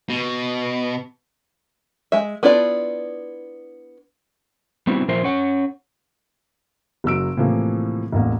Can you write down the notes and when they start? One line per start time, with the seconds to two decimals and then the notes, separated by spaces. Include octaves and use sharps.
0.10 B2
2.12 G#3 E5
2.43 B3 D4 E4 F4 D5
4.87 G3 B3 C4 D4 E4 F#4
5.08 A#2 F3 F4 A#4 C5 E5
5.23 C#4 C#5 F#5
7.04 F#1 F#3 E6 D7
7.37 A2 C3 E3 F3 A#3
8.13 E1 A1 A#3